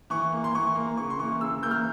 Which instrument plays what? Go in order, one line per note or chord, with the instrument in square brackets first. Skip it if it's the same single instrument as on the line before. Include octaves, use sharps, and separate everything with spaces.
[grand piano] E3 C#6
A#3
C6
E3 C#6
A#3
C#3 C#6
C6
E3 A#3 C#6
C#3 E6
E3 A#3 G6
F6